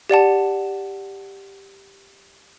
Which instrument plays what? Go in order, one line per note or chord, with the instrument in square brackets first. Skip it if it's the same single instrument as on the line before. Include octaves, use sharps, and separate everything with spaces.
[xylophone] G4 D5 F#5 A5